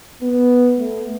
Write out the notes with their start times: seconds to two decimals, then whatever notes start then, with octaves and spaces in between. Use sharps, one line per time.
0.22 B3
0.77 A3